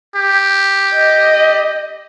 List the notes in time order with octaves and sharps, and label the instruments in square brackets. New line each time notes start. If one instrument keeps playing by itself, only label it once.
[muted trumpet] G4
[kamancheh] D#5